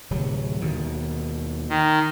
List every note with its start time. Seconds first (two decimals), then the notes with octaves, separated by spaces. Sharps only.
0.10 D1 C3 F#3
0.61 D#2 B2 D#3
1.69 D#3